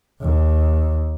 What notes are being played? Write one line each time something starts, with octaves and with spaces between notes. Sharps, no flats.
D#2